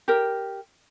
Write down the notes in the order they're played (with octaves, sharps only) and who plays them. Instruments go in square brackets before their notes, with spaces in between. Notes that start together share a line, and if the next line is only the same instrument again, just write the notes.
[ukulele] G4 A#4